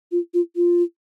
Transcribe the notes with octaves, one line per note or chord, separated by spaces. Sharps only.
F4
F4
F4